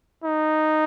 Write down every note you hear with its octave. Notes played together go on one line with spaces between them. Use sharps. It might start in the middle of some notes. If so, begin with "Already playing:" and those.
D#4